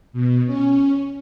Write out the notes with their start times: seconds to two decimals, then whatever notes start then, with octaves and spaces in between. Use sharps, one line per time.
0.13 B2
0.46 C#4